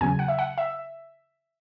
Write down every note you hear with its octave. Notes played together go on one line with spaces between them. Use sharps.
E2 C#3 F#3 G#5
F#5
E5
F#5
E5